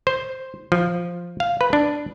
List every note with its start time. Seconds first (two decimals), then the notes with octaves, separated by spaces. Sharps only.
0.07 C5
0.72 F3
1.40 F5
1.61 B4
1.73 D4